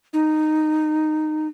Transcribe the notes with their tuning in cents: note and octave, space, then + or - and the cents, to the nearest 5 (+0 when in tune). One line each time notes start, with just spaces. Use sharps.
D#4 -10